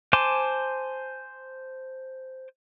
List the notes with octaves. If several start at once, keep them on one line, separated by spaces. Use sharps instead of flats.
C5 G#5 A5 C6 D6